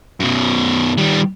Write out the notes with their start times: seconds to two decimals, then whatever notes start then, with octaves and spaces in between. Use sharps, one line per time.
0.20 F#2 B2
0.97 D#3 G3